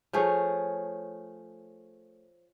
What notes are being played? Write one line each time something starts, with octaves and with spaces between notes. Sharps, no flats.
F3 A3 G#4 C#5